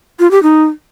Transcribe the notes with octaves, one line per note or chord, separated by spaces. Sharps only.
F4
G4
D#4